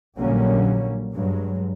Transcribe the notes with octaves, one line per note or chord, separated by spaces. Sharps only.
A#1 D3 F#3 G3 A#3 C#4
G2 F#3 G#3